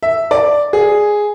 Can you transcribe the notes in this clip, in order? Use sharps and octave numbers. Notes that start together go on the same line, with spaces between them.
E5
D5
G#4